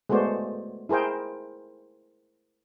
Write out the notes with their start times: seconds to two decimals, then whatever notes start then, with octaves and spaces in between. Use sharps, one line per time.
0.09 G#3 A3 B3 F#4 C5 D5
0.89 E4 G#4 A#4 C5 G5